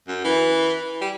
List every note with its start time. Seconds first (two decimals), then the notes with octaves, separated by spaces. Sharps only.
0.08 F#2
0.24 E3
1.01 G3